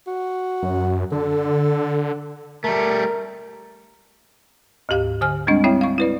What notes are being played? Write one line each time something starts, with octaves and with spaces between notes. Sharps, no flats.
F#4
F#2
D3 A4
G3 A3 A#4
D2 G#2 G4 F5
D3 C5 G#5 F6
G3 G#3 C4 D4 D#5
C4 E4 C#5 E5 G5
F5 C#6
E4 B4 D5